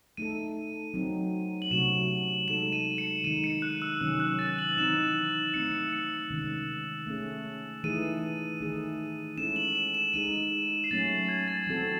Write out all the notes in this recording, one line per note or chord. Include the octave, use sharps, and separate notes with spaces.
A3 D#4 A4 D#7
F#3 C4 D#4
F#7
C3 F#3 A3 C#4 F#4 E7
G#3 D#4 A4 E7
D#7
C#7
D#3 G#3 D#4 D#7
C#7
F#6
E6
C3 D#3 F#3 C#4 E6
F#6
A6
F#7
E3 C4 D#4 E7
A3 C4 D#4 C#7
C#7
C3 D#3 G#3 C#4
A3 C#4 G#4
E3 A3 D#4 G#4 D#7
D#3 A3 D#4 G#4
G#3 C#4 E4 A4 E7
F#7
E7
E7
G#3 D#4 G#4 D#7
C7
F#3 A3 C#4 A6
A6
G#6
A6
E3 C4 F#4 A4